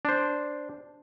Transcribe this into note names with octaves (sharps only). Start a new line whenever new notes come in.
D4 C5